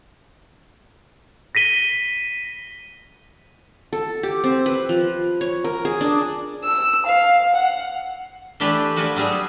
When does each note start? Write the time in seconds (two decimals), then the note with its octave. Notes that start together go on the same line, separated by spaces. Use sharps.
1.55 A#6 B6 D#7 G7
3.93 A4
4.23 G4
4.44 C4
4.66 B4
4.89 F3
5.41 C#5
5.64 A#4
5.85 G#4
6.01 D4
6.62 E6
7.06 F5
7.54 F#5
8.60 E3 A3 D4 G4 B4 E5
8.96 F3 F#4 B4 D5 G#5
9.16 F#3 G3 B3 G#4 E5